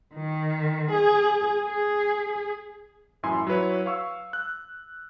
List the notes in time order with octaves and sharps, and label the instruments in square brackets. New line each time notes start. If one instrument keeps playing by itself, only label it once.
[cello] D#3
G#4
G#4
[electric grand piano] A1 F#2 E4 G#5 C6
F#3 E4 B4 C#5
F5 C#6 E6
F#6